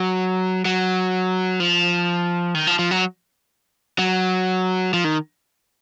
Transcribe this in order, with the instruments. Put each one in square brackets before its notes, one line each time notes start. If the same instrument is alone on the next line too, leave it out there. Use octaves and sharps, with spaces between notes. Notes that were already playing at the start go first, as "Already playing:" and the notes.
Already playing: [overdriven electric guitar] F#3
F#3
F3
D#3
F3
F3
F#3
F#3
F3
D#3